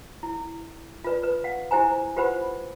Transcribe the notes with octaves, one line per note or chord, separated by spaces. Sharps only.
E4
F4 B4 D5
B4
F5 F#5
E4 G4 C5 G#5 A#5
F4 G4 B4 C5 F#5 B5